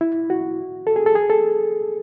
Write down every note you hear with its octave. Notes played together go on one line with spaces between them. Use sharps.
E4
F#4
A4
G#4
A4
G#4
A4